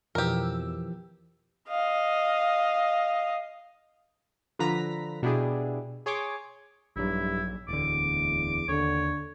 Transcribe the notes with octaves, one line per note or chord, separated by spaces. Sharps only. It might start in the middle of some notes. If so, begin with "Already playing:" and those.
F2 B2 E3 F3 G4 A#4 E6
D#5 F5
D3 F3 B4 A#5 A#6 B6
B2 D4 E4 G4 G#4
G#4 C#5 G#5 C6 D6
A#1 G2 F#3 E4
D1 E2 D3 D6
D#2 D3 C#5